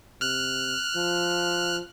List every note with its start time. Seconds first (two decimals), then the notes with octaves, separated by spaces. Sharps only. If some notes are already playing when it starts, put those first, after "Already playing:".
0.21 C3 F6 F#6
0.96 F3